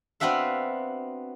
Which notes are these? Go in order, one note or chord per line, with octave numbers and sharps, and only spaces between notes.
B3 C4 D4 F#4 E5 F5